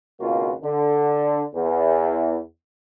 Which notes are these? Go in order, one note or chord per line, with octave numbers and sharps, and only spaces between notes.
G#1 C#2 B2 A#3 F4 F#4
D3
E2